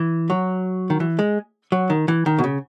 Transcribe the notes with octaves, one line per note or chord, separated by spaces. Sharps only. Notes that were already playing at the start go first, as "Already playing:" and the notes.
Already playing: E3
F#3
D#3
E3
G#3
F#3
D#3
E3
D#3
B2
C#3